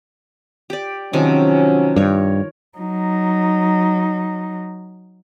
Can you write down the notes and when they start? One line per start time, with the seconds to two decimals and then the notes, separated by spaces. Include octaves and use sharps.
0.70 G4 D5
1.13 C3 D#3 F3 F#3 C#4
1.96 G2 A#4 C#5
2.78 F#3 D#4